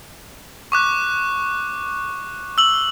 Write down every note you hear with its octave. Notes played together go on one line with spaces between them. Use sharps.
C#6 D6 F#6
E6 F#7